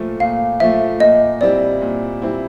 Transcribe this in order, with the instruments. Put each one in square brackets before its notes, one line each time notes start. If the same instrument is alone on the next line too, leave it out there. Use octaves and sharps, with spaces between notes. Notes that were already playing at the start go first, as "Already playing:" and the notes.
Already playing: [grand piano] A#2 F3 A3
[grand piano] A#2 [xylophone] F5
[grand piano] F3 A3 [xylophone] E5
[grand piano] A#2 [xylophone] D#5
[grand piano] G3 C4 E4 [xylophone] D5
[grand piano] A#2
G3 C4 E4